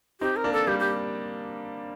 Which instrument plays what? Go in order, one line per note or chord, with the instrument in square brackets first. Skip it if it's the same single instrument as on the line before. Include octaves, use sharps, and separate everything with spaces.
[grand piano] C4 D#4 [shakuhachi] G4
[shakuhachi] A#4
[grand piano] A#3 D4
[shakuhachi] A4
[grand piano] G3 A#3 [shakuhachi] G4
[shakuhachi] G4